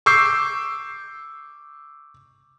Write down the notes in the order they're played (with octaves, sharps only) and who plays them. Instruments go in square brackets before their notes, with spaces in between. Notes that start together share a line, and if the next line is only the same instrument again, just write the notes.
[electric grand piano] C#6 D6 E6 G6 C7